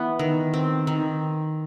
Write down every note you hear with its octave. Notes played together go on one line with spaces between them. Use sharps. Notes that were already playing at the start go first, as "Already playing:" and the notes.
Already playing: E3 B3
D#3
C4
D#3